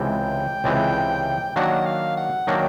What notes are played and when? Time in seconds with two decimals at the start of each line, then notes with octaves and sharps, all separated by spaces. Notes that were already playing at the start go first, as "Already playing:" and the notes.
Already playing: C#2 C3 E3 G#3 G5
0.64 C#2 C3 E3 G#3
1.56 D#3 F#3 A#3 D4 F#4 F#5
1.86 F5
2.17 F#5
2.47 D#3 F#3 A#3 D4 F#4 G5